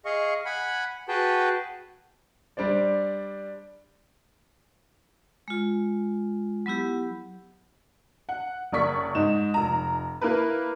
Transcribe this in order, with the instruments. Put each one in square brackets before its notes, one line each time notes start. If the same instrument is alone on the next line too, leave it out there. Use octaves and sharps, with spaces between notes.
[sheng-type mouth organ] G#4 D#5 F5 C#6
F#5 G#5 B5
F#4 G#4 B4 G5 A5
[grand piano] G3 D4 C5 D5
[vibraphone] G#3 F4
F#3 B3 E4 G4
[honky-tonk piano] F#5
F#1 A#3 D5 C#6 B6
G#2 D#4 E7
F1 A#5
A#3 E4 A#4 B4